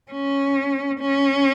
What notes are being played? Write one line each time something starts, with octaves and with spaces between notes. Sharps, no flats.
C#4
C#4